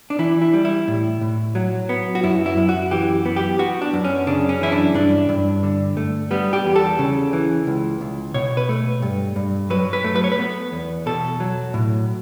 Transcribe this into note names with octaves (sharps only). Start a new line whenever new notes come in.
D4
E3 E4
E4
G3
E4
A2
A2
F#3
B3
F#4
F#2 E4
E4
F#2
F#4
E3 G4
B3
G4
B3 F#4
D4
F#2
C#4
C#3 D4
C#4
E3 E4
D4
G2 D4
G2
D3
A3
G3 B3
G4
E2
A4
C#3
E3
C#2
C#2
B2 C#5
B4
A3
G2
G2
F#3 B4
B4
A3
B4
C#5
B4
B3
E2
B2 A4
F#3
A2